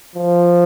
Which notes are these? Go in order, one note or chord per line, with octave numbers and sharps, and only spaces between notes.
F3